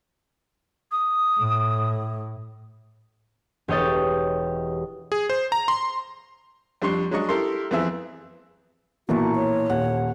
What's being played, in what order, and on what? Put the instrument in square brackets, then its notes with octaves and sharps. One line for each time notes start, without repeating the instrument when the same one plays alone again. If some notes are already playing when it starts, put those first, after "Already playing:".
[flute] D#6
[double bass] A2
[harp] E1 G4 C#5 D#5 G6 A6
[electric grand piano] G#4
C5
A#5
C6
[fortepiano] F2 G3 D4 C6 C#6
F#3 G#3 D4 D#5 C#6
E4 G4 A4 A#4 C6
F2 E3 B3 C4 G#4 E5
[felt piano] B1 A#2 E3 [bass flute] F#4 [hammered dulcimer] A#4 A5 C#6
[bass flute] C#5
[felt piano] D#1 [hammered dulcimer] F#5